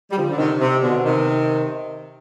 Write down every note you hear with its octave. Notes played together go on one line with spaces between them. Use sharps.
G3
D3 F3
D3
C3 D#3
C3
B2 D3
C3 D#3